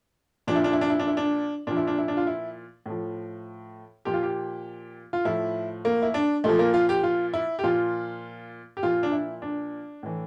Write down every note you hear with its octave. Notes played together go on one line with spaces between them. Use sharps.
A#2 F3 D4
E4
D4
E4
D4
E4
D4
E4
D4
A#2 F3 D4
E4
D4
E4
D4
F4
E4
A2 F3
A#2 F3 G4
F4
G4
F4
A2 F3 E4
A#3
E4
D4
A#2 F3 A3
A#3
F4
G4
F4
E4
G4
A#2 F3 F4
G4
A#2 F3 F4
D4
E4
D4
A2 E3